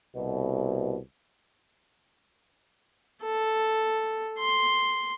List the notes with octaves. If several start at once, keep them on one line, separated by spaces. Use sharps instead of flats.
C2 B2
A4
C6